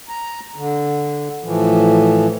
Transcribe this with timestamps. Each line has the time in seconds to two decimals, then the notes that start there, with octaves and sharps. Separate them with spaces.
0.09 A#5
0.56 D3
1.44 A2 E3 F3